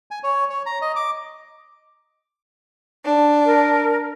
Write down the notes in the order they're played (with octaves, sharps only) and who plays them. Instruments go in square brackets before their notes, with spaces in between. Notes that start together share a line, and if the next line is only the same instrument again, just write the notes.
[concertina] G#5
C#5
C#5
A#5
D#5
D6
[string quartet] D4
[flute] A#4